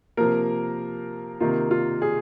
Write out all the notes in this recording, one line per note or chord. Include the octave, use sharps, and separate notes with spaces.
C3 F3 A#3 A#4
C3 D#3 A#3 F4
F4
G#4